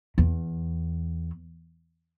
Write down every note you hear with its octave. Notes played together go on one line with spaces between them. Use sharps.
E2